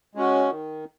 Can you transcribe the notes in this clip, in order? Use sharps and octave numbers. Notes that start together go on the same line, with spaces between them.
G#3 C#4 F#4
D#3